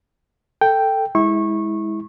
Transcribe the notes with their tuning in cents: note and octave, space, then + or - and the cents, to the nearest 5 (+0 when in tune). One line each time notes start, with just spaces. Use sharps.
A4 +15 G5 +0
G#3 +0 E4 -25 C#6 -20